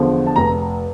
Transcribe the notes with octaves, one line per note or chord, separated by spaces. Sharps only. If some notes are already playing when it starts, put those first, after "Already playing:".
Already playing: E2 D3 F3
A5
F1 A#5